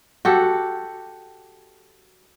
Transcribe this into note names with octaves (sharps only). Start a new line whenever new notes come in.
F#4 G4 A4